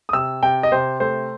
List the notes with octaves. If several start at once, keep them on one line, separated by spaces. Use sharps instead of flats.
D#6
C3 E6
C3 G5
D#5
C3 C5
A3 C5